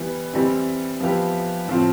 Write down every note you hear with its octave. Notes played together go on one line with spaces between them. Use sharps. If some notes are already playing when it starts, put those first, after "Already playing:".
Already playing: E3 G3 B3
E3 G3 C4 E4
F3 B3 E4 G4
A2 F3 C4 F4